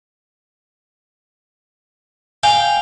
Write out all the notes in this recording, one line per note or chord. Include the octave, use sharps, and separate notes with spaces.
F5 G5 G#5